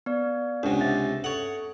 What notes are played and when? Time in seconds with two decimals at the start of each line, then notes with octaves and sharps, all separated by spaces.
0.06 B3 D5
0.63 C#2 C3 D4 F#5
0.81 C4 E5 A6
1.24 A4 C#5 F#5